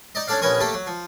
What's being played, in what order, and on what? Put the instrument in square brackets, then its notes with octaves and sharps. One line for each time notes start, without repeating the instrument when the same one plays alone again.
[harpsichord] D#4 D5 D#5
C#4 D4 A4 D5 F5
A#1 B3 C#4 A#4 C#6 D#6
A3 A#3 G4 A4
F#3
F3